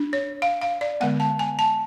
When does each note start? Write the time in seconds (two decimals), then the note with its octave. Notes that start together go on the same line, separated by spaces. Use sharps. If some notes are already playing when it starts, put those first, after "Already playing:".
Already playing: D4
0.13 C#5
0.42 F5
0.62 F5
0.81 D5
1.00 D3 G#3 B3 F#5
1.20 A5
1.39 G#5
1.59 A5